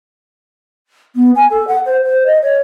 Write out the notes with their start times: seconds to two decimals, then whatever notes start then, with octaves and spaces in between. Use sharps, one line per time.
1.16 B3
1.35 G#5
1.51 A4
1.68 F#5
1.86 C5
2.04 C5
2.26 D#5
2.42 C#5